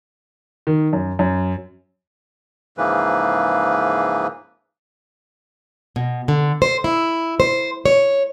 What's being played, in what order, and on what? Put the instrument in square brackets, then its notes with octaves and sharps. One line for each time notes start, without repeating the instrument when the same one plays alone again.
[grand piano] D#3
F#2
F#2
[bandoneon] G#2 C#3 E3 F3 A#3 B4
[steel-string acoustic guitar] B2
D3
C5
E4
C5
C#5